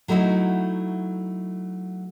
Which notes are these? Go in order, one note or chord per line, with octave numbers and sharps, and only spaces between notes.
F#3 A3 D#4 E4 F#4